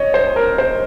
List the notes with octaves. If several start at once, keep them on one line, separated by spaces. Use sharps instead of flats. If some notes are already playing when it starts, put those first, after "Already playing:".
Already playing: C#5 D#5
C5
A#4
C5